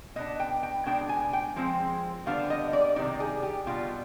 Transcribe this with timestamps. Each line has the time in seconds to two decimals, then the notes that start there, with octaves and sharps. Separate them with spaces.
0.16 B2 B3 D4 D#5
0.40 G5
0.63 G5
0.86 B2 G#3 D4 G5
1.09 G#5
1.33 G5
1.56 F3 G#3 C4
2.26 D3 G3 B3 D4 F5
2.50 D#5
2.73 D5
2.96 C3 D#3 G3 C4 D#4 D5
3.20 G#4
3.43 G4
3.66 B2 G3 D4 F4